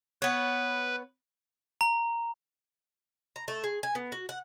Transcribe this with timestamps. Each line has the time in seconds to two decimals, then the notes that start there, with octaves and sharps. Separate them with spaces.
0.22 B3 B4 C#5
1.81 A#5
3.36 A#5
3.48 A3
3.64 G#4
3.83 G#5
3.95 B3
4.12 F#4
4.29 F#5